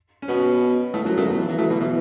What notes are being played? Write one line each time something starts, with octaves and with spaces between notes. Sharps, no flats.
C#4
B2 B3
A2 A3
F#2 F#3
F#2
A3
B2
E3
E3 F#3
A3
B2 E3
B2 E3